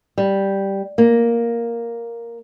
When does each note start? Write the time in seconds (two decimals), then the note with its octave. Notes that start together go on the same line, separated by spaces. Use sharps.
0.18 G3
0.98 A#3